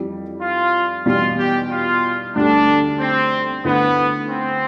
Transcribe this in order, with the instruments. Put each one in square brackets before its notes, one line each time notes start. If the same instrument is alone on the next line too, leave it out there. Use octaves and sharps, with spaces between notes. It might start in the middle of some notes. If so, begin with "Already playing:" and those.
Already playing: [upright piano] F2 E3 G3
[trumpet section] F4
[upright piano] E2 B2 G3 [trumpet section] F4
[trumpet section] G4
F4
[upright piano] D2 D3 G3 [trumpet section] D4
[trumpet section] C4
[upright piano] D2 D3 A3 E4 [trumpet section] B3
[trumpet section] C4